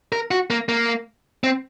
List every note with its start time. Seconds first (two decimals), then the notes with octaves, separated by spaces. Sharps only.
0.12 A#4
0.31 F#4
0.50 A#3
0.69 A#3
1.44 C4